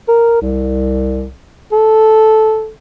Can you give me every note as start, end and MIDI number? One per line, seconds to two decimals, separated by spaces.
0.09 0.40 70
0.42 1.31 36
1.72 2.70 69